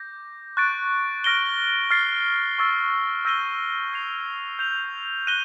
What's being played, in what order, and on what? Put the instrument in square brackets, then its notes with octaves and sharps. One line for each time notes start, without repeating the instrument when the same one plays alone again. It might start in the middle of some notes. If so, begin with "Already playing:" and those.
Already playing: [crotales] D6 G6 A#6
C#6 F#6 A6 D7
F6 A#6 D7 G7
F6 A6 C7
C#6 E6 A6
E6 G6 A#6 D#7 G7
G#6 C7 F7
G6 C7 F7
F#6 A#6 D#7 G7